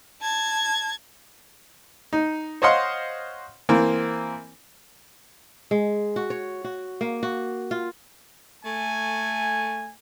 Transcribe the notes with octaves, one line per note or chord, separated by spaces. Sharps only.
A5 G#6
D#4
C5 C#5 D#5 F5 F#5 C6
E3 A#3 C4
G#3
F#4
C#5
F#4
A#3
F#4
F4
A3 G#5